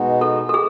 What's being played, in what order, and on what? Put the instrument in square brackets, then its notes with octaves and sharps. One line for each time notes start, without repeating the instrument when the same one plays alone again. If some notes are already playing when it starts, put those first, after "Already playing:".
Already playing: [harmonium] B2 G#3 B3 D#4 F#4
[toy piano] A4
A4
G#4